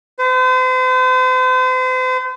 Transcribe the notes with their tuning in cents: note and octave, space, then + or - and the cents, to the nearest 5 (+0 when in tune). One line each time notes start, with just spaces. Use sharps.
C5 -40